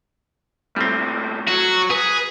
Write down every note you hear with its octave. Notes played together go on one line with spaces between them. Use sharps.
A#2 G3 A3 C4
F#3 F#4
G#4 B4